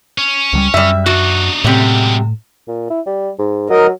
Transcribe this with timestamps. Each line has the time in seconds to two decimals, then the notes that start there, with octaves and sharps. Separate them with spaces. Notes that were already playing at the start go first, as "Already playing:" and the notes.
0.18 C#4
0.53 C#2 F#3 G3
0.74 F#2 G3 E5
1.06 D4 D#4 F#4
1.64 F#2 A2 C3 G3 G#3
2.68 A#2
2.90 E4
3.07 G3
3.39 G#2
3.70 F#3 A#4 D#5